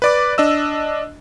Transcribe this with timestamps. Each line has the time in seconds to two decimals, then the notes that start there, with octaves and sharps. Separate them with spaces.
0.02 B4 D5 D6
0.38 D4 D#5 E6